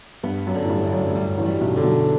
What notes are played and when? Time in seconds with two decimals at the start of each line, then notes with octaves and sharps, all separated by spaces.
0.23 G2 B3
0.47 F#2
0.55 D3
0.65 A2
0.70 G2
0.85 D2
0.92 F#2
1.09 A2
1.15 G2 G3
1.38 A1 A2
1.46 G3
1.61 B1 B2
1.76 D3
1.84 B1 B2